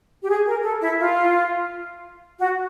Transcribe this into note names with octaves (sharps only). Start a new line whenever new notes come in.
G4
G#4
A#4
A4
E4
F4
F#4